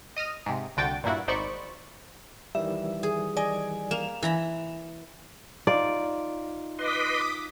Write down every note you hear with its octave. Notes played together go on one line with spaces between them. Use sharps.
D#5 D#6 F6 A#6
G#2 C3
C2 D3 F#4 G5 A6
G2 A#2 A#3 E4 F#4
G#1 D#4 C5 D5 B5 C#6
D#3 E3 G3 E5
G#4
D5 D#5 G#5
A#3 E7 F7
E3 A#5 B5
D#4 F4 D5 F5
B4 D#5 C6 D6 D#6 B6